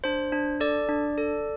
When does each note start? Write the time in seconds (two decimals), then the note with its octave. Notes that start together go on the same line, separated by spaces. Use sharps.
0.04 D4 C5
0.32 D4
0.60 A4 D5
0.89 D4
1.18 A4